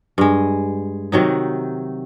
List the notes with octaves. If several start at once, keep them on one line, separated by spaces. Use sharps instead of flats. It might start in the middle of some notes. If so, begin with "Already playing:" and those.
G2 G#3
C3 D#3 F#3 D#4